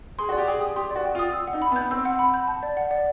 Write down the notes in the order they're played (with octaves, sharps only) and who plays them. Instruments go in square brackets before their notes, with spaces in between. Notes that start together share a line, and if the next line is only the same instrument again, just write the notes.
[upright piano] G#4 [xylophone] C6
[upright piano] F#4 [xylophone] D5
[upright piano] G4
[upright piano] G#4 [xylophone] G5
[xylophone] D#6
[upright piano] G4 [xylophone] C6
[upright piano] F#4 [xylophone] D5
[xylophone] G5
[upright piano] F4
[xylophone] D#6
E6
F#5
[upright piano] D#4
[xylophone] B5
[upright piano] B3
[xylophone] G6
[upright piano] C4 [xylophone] E6
[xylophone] F#5
B5
G6
A5
D5
F#5
D5